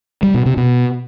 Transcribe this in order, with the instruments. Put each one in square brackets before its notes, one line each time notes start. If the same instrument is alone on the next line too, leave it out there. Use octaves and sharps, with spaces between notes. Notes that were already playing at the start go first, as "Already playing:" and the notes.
[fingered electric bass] G3
B2
C3
B2